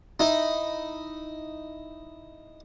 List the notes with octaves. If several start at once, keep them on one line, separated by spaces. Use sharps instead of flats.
D#4 E4